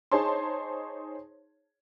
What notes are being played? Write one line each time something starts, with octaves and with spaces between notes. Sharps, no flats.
D#4 G#4 C5 C#5 A5 C6